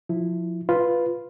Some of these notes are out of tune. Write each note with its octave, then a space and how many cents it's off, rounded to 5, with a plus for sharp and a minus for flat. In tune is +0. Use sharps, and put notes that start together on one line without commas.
F3 +20 E4 +0
F4 +0 B4 +0